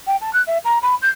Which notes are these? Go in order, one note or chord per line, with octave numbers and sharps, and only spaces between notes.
G5
A5
F#6
E5
A#5
B5
G6